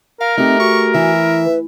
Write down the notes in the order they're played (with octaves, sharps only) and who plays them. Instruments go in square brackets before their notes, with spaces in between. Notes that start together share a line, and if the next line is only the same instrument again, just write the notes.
[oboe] A#4 [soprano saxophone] F5
[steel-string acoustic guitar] A3 G4 [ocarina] C4 [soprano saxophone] D#4
[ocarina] F#4 [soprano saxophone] C#6
[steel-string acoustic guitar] E3 [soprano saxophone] E5
[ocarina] B4